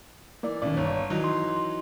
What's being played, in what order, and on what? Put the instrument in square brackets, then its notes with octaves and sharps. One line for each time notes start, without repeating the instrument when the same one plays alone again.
[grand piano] E3 [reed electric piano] A#3 D5
[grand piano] B1 [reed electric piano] D#3 C#4 D5
[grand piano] G1 [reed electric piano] C#5
[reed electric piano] D#3 [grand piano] E3 F#3 D#4
[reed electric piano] C6